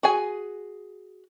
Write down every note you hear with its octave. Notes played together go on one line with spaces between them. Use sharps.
F#4 G#4 G#5